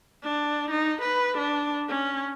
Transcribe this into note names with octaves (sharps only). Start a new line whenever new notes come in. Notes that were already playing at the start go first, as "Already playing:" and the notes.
D4
D#4
B4
D4
C#4